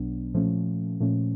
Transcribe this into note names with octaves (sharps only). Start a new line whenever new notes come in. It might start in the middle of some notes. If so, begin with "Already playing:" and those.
Already playing: B1 B2 F#3 B3 D4
A#2 F3 A3 C#4
A#2 F3 A3 C#4